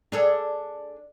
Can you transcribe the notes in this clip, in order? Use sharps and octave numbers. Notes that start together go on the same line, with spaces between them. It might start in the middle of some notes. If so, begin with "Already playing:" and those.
D4 G#4 A4